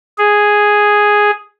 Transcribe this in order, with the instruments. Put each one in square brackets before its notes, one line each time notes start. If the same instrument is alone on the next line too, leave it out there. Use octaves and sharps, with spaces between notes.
[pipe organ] G#4